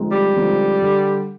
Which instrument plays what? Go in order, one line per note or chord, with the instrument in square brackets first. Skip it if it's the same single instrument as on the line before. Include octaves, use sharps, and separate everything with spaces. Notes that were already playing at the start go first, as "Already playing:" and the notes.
Already playing: [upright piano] D3 F3 G#3 C4 D#4
[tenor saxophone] G3
[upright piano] D3 F3 G#3 C4 D#4
D3